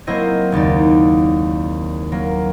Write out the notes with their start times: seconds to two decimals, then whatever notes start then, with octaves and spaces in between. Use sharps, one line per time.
0.07 F#3 A#3 C4 E4 C5 D#5
0.52 F#1 D#2 D#4 D5
2.12 F#3 A#3